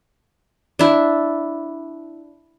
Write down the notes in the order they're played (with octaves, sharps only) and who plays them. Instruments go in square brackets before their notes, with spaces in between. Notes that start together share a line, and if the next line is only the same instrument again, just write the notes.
[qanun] D4 E4